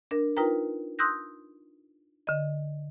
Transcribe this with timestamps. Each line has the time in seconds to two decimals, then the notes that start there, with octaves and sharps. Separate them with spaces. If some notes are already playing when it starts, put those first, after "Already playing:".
0.11 D4 A#4
0.37 D#4 F4 A#4 B4 G5 A#5
0.99 C6 D#6 E6 F#6 G6 A#6
2.27 D3 D#5